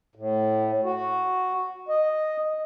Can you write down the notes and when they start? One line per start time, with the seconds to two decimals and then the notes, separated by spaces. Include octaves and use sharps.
0.15 A2
0.84 F#4
1.88 D#5